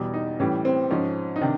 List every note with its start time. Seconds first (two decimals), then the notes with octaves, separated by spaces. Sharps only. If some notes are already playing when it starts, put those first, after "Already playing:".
Already playing: E2 B2 G3
0.14 D#4
0.40 A2 E3 G3 C#4
0.65 C4
0.91 G#2 F3 C#4
1.36 D#4
1.41 C3 D#3 D4